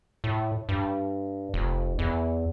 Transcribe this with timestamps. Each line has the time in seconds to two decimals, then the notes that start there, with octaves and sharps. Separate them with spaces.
0.24 A2
0.69 G2
1.54 F1
1.99 E2